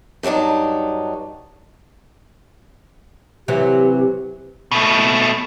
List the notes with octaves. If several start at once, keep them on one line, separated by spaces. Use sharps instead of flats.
G2 F#3 G3 D4 D#4
C3 E3 F#3 G4
B2 A3